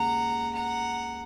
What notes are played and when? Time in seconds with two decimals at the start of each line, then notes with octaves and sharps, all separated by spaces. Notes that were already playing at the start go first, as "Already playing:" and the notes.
Already playing: D#2 C#3 G#3 F#5 A#5
0.53 F#5 A#5